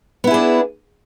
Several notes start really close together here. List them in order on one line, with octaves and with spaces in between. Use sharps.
B3 E4 G#4 D4